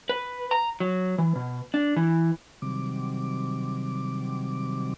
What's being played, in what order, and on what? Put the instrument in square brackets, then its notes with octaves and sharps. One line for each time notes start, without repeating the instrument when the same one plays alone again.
[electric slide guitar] B4
A#5
F#3
E3
B2
D4
E3
[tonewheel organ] C3 D#3 F#3 G3 C4 D6